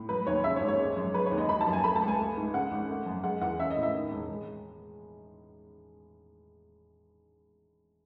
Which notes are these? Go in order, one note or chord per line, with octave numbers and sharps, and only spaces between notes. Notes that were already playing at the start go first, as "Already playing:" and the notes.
Already playing: A2
F#3 B4
D#2 C#5
C#3 E5
C#5
G#1
C#5
G#3
F#2
G#3 B4
C#5
D#2
D#5
F#3 B5
A5
F#2
G#5
A3 B5
A5
C#2
G#5
A3
G#2
C#3 F#5
G#1
A3
F#2
G#3 F#5
E2 F#5
C#4 E5
D#5
A2
E5
D#3
E1
G#3